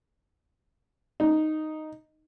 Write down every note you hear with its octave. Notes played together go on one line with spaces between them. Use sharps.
D#4